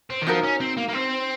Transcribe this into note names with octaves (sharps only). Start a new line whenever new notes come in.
C4
D#3
F3 D#4 F#4 A#4
C#4
C4
A#3
A#3
C4